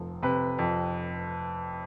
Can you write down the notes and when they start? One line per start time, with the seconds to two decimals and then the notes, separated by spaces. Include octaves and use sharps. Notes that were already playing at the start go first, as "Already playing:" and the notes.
Already playing: F1 F3
0.22 C3 B4
0.58 F2